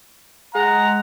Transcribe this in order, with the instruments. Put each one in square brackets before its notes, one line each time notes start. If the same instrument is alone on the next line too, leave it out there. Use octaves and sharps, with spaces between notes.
[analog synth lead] G#3 [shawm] F#5 [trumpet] A#5